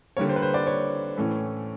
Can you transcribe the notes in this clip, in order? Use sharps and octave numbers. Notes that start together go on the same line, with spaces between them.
D3 G3 A#3 C#5
C5
B4
C5
D5
C#5
A2 E3 A3 C#4